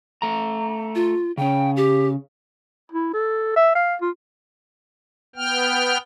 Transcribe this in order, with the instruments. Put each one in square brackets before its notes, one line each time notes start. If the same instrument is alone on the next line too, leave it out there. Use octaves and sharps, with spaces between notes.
[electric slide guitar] A3 A#5
[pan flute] F4
[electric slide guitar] C#3 C#4 [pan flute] G5
[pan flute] G4
[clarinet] E4
A4
E5
F5
F4
[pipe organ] B3 G5 F6